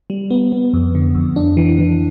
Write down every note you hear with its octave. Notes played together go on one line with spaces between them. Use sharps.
G3
B3
B3
F2
D3
F2
D4
E3
E3